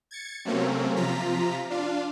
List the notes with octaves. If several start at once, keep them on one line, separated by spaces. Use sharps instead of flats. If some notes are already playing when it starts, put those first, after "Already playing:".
G#6 A6 C#7
C3 F#3 A3 A#3 C4 C#4
C3 F3 F4 A#5 B6
D4 F4 F5